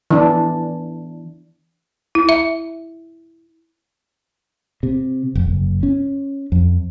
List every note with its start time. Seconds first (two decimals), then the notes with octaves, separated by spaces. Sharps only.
0.11 E3 D4
2.15 E4
2.29 E5
4.83 C3
5.35 F1
5.48 F#1
5.83 C#4
6.52 F2